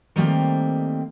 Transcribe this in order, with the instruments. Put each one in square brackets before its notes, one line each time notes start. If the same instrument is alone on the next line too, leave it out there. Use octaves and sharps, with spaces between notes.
[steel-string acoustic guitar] D#3 G3 A3 A#3 C4